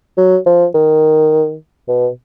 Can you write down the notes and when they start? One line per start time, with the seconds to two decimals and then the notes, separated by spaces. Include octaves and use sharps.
0.17 F#3
0.46 F3
0.74 D#3
1.88 B2